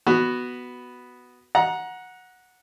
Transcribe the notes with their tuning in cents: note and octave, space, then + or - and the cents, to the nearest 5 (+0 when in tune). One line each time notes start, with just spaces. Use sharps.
B3 +0 F#4 +0
F#5 -10 A#5 +20